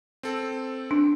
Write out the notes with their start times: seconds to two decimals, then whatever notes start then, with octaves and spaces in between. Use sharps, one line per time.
0.23 C4 A4
0.91 D4